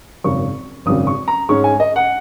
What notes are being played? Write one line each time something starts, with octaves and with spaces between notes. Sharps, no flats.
G#1 F#2 C#3 C#6
G#1 F#2 C#3 D#6
C#6
A#5
G#2 G#3 C#4 C#6
G#5
D#5
F#5